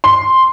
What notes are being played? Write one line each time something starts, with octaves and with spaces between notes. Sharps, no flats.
C6